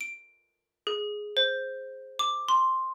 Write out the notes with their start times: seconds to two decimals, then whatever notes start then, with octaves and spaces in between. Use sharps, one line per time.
0.01 D7
0.87 G#4
1.37 C5
2.19 D6
2.48 C6